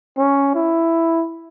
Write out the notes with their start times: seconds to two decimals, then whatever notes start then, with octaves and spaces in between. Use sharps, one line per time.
0.17 C#4
0.55 E4